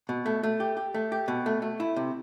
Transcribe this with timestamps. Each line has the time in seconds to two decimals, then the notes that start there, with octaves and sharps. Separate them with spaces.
0.09 B2
0.26 A3
0.43 A3
0.60 G4
0.77 G4
0.94 A3
1.12 G4
1.28 B2
1.46 A3
1.62 A3
1.80 E4
1.96 C3